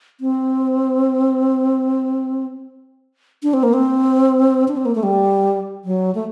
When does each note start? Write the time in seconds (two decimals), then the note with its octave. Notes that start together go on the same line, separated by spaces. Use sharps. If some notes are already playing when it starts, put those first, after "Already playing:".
0.21 C4
3.43 D4
3.54 C4
3.63 A#3
3.73 C4
4.68 D4
4.77 C4
4.85 A#3
4.95 A3
5.03 G3
5.85 F#3
6.15 A3